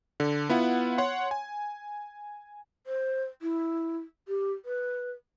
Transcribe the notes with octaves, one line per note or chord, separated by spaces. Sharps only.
D3
B3 E4 F4 F#5
C#5 F#5 C6
G#5
C5
E4
G4
B4